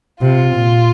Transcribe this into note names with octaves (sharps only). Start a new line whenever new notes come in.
C3 F4
A#2